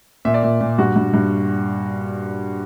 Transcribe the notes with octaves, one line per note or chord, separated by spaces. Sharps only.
A#2 E5
D5
A#2 E5
A#2
G2 F#4
G2
G2